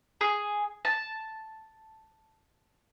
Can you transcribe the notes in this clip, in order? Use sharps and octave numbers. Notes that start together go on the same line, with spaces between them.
G#4
A5